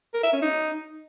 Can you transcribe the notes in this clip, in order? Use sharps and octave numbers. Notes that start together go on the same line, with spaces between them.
A#4
E5
C#4
D#4